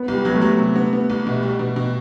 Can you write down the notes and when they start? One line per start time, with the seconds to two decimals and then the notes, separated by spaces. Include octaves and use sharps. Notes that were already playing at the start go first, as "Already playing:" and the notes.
Already playing: B3
0.08 C2
0.14 G3
0.25 F#3 B3
0.36 A3
0.41 F#3
0.58 C3
0.76 B3
0.93 B3
1.10 C2
1.27 B2
1.43 G3
1.59 B2
1.76 B2